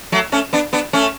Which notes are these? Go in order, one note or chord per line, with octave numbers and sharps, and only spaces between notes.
F#3 A3
A3 C#4
B3 D4
B3 D4
A3 C#4